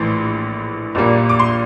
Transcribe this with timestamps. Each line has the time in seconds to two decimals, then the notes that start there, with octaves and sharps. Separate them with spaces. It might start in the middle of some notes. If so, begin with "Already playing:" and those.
Already playing: A#1 A2 E3 C6
0.95 A#1 A#2 G3 A#3
1.29 D6
1.39 C6